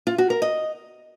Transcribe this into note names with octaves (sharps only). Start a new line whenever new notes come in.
F4
F#4
A#4
D#5